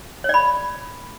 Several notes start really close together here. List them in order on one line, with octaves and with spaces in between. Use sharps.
C#5 D5 B5